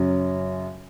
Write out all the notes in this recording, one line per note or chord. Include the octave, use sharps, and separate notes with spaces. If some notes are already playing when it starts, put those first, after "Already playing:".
Already playing: F#2 C#3 F#3 C#4